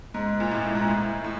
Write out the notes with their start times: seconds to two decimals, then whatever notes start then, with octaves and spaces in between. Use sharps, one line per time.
0.14 G#2
0.40 A#2
0.51 A2
0.75 G#2
0.88 A2
1.24 A2